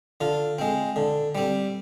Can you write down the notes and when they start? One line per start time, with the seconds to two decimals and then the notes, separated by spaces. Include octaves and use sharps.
0.21 D3 F4
0.59 G#3 C4
0.96 D3
1.35 G3 C4